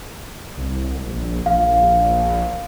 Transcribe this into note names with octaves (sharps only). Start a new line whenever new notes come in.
C2
A#1
A#1 F5